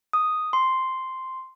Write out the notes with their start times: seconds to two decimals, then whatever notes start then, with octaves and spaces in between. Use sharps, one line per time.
0.13 D#6
0.53 C6